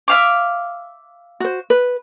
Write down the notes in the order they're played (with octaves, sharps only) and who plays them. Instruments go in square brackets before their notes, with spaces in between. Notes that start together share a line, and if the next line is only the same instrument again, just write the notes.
[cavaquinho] E5 F5 D6
[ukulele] F#4 C5
B4